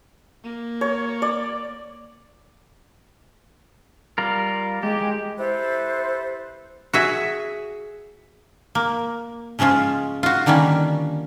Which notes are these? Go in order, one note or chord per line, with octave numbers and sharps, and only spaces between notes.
A#3
C#5
D5
G3 F4 A#4
G#3 G4
E4 G4 A4 B4 C5
F#4 G#4 E5
A#3
C#3 F3 G#3 C#4 F4
F4 F#4
D3 D#3 G3 A#3 C#4